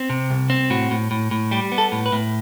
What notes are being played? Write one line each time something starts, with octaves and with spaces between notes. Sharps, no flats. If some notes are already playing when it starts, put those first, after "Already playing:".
Already playing: C4
C3
C2
C4
A2 F#4
A2
A2
A2
G3 G4
B3
A4
A2
B4
A2